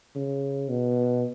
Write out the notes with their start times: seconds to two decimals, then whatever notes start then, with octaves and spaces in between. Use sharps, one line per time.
0.16 C#3
0.69 B2